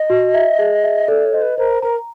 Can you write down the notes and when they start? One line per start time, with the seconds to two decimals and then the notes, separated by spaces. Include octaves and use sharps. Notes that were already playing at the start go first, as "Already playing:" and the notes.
Already playing: D#5
0.10 F#4
0.34 E5
0.59 G#4
0.84 E5
1.08 A4 D5
1.25 C#5
1.33 C5 D#5
1.42 B4
1.58 A#4 C5
1.82 A#4 A#5